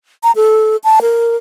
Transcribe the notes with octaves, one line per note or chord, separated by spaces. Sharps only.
A#5
A4
A5
A#4